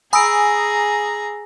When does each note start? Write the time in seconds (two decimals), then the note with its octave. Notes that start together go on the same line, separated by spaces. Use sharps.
0.13 G#4 G#5 A#5 B5 D#6 E6 D7